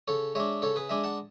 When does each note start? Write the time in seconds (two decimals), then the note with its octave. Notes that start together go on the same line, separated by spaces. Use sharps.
0.08 C#3 A4 C#5
0.35 G#3 D4 C#5 E5
0.62 C#3 A4 C#5
0.76 G#4 B4
0.89 G#3 D4 E5 G#5
1.04 F#5 A5